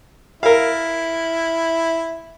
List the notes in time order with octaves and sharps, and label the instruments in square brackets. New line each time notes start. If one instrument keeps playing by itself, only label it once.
[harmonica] E4 [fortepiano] A#4 F5